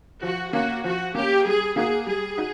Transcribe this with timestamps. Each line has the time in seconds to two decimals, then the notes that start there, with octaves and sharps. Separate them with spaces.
0.22 F3 F#4
0.53 A#3 C#4 F#4
0.84 F3 F#4
1.15 A#3 C#4 G4
1.45 G3 G#4
1.76 A#3 D#4 F#4 G#4
2.06 G3 G#4
2.37 D#4 F#4